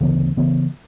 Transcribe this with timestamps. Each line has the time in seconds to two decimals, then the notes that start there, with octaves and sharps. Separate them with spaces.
0.01 D2 C#3 E3 B3
0.37 C#3 E3 B3